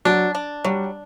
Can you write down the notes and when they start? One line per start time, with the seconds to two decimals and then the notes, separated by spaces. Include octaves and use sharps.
0.05 F#3 D4
0.35 D4
0.65 F#3 G3